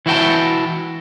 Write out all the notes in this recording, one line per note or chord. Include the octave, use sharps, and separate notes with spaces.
E3 E4 F#4 G5 A5